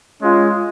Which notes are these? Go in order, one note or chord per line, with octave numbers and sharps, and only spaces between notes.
G#3 C#4 F4